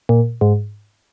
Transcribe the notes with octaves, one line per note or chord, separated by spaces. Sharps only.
A#2
G#2